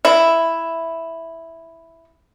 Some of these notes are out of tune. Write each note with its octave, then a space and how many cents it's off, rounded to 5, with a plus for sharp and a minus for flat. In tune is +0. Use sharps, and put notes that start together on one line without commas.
E4 +0 E5 +0